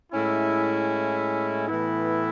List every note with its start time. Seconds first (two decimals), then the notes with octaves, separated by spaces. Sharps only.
0.13 A2 G#3 C#4 E4
1.67 A2 E3 B3 E4